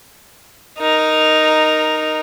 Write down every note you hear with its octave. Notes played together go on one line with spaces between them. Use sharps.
D#4 A#4